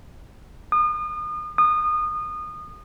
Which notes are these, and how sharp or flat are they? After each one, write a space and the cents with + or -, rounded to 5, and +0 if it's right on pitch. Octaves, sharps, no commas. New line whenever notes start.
D#6 -35
D#6 -25